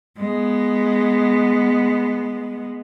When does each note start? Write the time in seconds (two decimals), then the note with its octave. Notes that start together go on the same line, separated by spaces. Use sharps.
0.18 G#3 B3